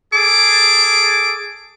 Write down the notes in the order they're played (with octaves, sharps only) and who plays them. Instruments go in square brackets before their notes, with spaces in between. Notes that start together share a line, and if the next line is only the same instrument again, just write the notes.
[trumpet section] G#4 A4 D6